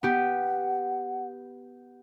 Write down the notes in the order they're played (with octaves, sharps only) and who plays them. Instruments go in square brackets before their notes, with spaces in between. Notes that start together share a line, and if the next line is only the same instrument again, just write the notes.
[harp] B3 G4 [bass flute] F#5